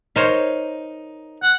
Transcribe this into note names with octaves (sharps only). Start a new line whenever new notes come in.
D#4 A#4 C5 C#5
F#5